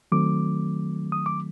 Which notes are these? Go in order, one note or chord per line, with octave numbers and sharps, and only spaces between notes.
D#3 F#3 A3 C4 D6
D#6
D6